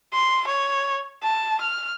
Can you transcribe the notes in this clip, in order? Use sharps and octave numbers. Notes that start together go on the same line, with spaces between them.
C6
C#5
A5
F6